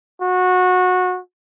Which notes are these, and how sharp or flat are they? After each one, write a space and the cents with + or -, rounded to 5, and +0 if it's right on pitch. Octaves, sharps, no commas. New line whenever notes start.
F#4 -20